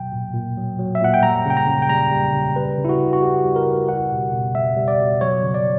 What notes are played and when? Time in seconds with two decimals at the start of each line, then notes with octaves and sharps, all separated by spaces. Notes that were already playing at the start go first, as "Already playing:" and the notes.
Already playing: B2 F#3 G5
0.12 A#2
0.34 A#2
0.57 F#3
0.79 F#3
0.95 E5
1.01 A#2 F#5
1.14 G5
1.23 G3 A#5
1.45 C#3 G5
1.57 A#5
1.67 C#3
1.82 G5
1.89 G3 A#5
2.11 G3
2.34 C#3
2.56 G3 B4
2.78 C#3
2.85 E4
2.89 F#4
2.99 C#3
3.13 F#4
3.22 G3 G4
3.45 G3
3.56 A#4
3.67 C#3
3.88 G3 F#5
4.11 B2
4.33 B2
4.55 G3 E5
4.77 G3
4.88 D5
5.00 B2
5.21 F#3 C#5
5.43 C#3
5.54 D5